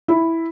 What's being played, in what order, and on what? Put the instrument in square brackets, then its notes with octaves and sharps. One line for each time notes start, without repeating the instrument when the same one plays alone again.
[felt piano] E4